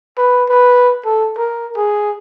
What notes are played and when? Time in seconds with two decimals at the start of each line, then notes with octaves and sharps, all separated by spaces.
0.18 B4
0.49 B4
1.05 A4
1.38 A#4
1.77 G#4